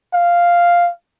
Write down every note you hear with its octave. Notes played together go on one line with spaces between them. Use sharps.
F5